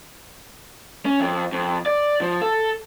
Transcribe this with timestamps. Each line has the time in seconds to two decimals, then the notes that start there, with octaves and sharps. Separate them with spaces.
1.05 C#4
1.20 F2
1.52 F2
1.86 D5
2.21 F3
2.41 A4